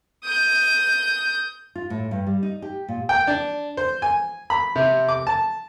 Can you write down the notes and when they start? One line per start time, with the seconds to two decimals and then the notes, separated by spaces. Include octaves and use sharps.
0.25 D#6 G6
1.75 F4
1.90 A2
2.11 G2
2.27 G3
2.43 D#4
2.62 G4
2.89 A#2
3.09 G5
3.27 D4
3.77 C5
4.02 G#5
4.50 B5
4.76 C3
5.08 D6
5.27 A5